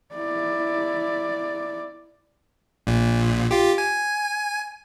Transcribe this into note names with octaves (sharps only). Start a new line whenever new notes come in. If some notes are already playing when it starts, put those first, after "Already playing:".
E4 D5
A#1 A#2
F4 G4
G#5